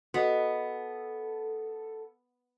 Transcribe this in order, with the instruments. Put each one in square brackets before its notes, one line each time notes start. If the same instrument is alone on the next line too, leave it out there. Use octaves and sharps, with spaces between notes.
[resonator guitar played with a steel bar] B3 [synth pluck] F#4 D#5 [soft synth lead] A4